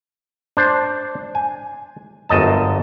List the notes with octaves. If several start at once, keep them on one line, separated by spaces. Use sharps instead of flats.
D4 C5
G#5
G1 F#2 D#5 A5